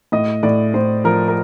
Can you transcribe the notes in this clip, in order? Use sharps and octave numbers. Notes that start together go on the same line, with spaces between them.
A2 D#5
A2 D5
A2 C5
F3 A#4
A#4